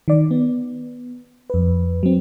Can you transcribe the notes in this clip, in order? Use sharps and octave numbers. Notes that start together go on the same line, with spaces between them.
D#3 D5
B3
F2 B4
F#3 C4